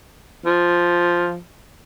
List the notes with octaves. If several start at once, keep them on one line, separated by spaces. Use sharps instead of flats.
F3